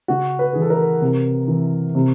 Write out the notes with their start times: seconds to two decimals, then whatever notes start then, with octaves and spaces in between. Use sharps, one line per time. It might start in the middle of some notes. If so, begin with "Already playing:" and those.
0.08 C#3 F#4
0.39 B4
0.53 E3 G#4
0.62 A4
0.70 A#4
1.02 C3
1.48 E3
1.95 C3